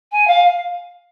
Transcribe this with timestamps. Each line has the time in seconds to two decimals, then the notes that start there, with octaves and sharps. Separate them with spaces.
0.12 G#5
0.27 F5